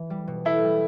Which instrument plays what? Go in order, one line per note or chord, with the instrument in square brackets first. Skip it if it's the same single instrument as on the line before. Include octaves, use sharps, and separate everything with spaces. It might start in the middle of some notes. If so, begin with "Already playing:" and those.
Already playing: [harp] E3
G3
B2
[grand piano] E4 [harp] A4
[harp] G3